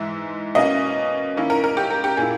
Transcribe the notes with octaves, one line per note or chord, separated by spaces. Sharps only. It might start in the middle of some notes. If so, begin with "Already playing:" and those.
Already playing: G#2 E3 G#3 E5
B2 A#3 C#4 D#5
D#3 A#3 C#4 E4
A#4
A#4
G4
A#4
G4
A#2 A#3 E4 G#4